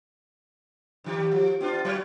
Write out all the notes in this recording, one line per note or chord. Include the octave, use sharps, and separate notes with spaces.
G2 D#3 G4
F3
B3 D4 F4
F#3 F#4 C#5